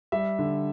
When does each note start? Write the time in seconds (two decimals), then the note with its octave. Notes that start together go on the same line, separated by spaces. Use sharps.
0.12 G3 E5
0.39 D3